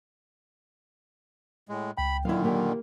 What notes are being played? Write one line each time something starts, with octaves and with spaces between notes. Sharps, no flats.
A2 G#3
C#2 G5 B5
A#2 D3 D#3 F#3 E4 F5
A#3 G4